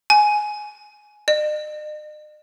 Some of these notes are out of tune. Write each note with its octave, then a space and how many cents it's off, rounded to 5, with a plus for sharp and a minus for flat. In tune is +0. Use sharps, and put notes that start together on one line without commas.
G#5 +10
D#5 -45